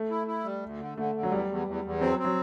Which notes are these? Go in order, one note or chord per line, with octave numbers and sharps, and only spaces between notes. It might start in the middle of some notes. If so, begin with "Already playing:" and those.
Already playing: A3
E4
E4
G3
D2
D3
D3 A3
D3
F#3
E2 G3
E2
E2
E2
F#3 C4
C4
F#3